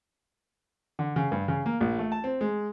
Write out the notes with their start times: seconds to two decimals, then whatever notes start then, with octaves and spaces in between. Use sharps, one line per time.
0.99 D3
1.16 C#3
1.32 G2
1.48 C#3
1.66 A#3
1.80 A#1
1.99 A3
2.12 A5
2.24 C4
2.41 G#3